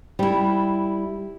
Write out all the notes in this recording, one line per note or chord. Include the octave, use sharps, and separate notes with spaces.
G3 E4